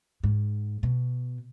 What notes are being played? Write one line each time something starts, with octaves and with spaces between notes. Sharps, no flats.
G#2
B2